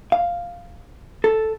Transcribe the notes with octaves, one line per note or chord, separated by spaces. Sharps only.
F5
A4